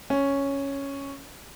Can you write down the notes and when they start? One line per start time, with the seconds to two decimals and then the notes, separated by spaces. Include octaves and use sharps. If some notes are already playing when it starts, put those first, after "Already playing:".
0.10 C#4